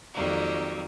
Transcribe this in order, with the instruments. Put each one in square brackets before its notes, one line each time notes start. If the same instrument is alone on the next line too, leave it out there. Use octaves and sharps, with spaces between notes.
[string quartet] F2 D#3 F#3 G3 A#3